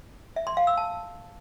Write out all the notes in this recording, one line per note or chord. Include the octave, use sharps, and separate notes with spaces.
E5
C6
F5
E6
A5